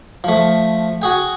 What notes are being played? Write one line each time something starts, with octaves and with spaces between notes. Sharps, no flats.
F3 A3
F#4 G#4 G5